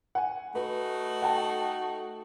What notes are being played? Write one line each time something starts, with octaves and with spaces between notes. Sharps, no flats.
F#5 G#5
A3 D#4 F#4 B4
F#5 G5 A5